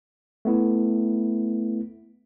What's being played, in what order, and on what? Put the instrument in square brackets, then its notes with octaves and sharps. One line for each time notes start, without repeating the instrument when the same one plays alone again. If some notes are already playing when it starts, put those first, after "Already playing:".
[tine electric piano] A3 B3 E4